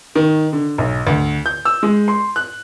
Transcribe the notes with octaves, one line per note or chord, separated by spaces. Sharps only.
D#3
D3
B1
D2
G6
E6
G#3
C6
F#6